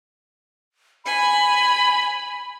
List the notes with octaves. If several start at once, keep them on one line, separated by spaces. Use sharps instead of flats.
G#5 B5